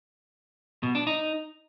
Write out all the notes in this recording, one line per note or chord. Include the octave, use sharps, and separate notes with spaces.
B2
D4
D#4